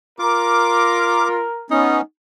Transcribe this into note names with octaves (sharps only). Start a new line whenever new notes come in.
F4 A#4 D6
B3 C#4 D#4